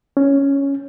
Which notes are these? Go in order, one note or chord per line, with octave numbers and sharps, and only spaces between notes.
C#4